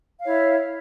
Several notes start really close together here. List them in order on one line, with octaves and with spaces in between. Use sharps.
F5 C#5 E4 E5